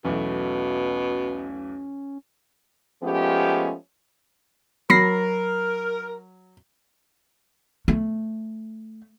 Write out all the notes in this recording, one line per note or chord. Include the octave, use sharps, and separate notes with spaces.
B1 E2 B2 A3 C#4
F3 G#3 A3 B3 C#4 G4
F#3 A#4 B5 A#6 C7
A3